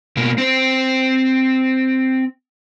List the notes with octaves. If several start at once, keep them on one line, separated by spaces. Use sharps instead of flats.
B2 A#3
C4 C5